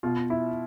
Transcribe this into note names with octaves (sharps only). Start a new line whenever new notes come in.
B2 F4
E4